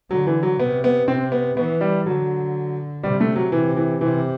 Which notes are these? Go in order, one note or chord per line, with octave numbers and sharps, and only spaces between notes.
D3 F#3
E3
F#3
C3 B3
B3
C3 C4
B3
E3 B3
G3
D3 F#3
C3 G3
A3
F#3
C3 E3
E3
C3 E3